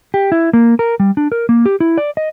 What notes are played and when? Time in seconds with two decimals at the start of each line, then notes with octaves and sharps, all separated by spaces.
0.14 G4
0.32 E4
0.53 A#3
0.79 A#4
1.00 G3
1.17 D4
1.32 A#4
1.49 A#3
1.66 G4
1.80 E4
1.98 D5
2.17 D#5